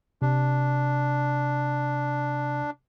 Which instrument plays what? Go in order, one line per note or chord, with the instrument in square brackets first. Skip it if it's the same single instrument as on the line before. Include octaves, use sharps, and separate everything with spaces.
[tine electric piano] C3 [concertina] D4